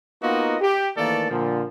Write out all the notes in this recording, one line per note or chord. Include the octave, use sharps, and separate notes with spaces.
A#3 B3 D#4 F4 F#4 D#5
G4
D#3 E3 A3 A#3 A4 D5
A#2 D3 F3